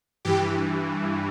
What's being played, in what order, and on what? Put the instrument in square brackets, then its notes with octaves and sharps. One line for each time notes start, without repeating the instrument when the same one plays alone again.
[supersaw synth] G2 E3 G4